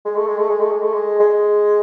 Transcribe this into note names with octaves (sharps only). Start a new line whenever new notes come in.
G#3
A3
G#3
A3
G#3
A3
G#3
A3
G#3
G#3